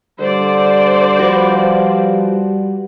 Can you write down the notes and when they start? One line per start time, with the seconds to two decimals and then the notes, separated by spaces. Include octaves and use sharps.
0.20 D3 G3 C5 D5
1.19 F3 F#4 B4